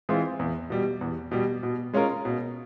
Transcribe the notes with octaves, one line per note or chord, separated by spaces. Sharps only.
E3 G#3 C4 F4
E2
B2 G3
E2
B2 G3
B2
G#3 C#4 F4 A#4
B2